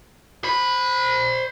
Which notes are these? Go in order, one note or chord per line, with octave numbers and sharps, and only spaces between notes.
C5 B5